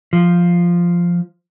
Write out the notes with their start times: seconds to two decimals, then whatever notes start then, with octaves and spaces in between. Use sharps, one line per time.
0.13 F3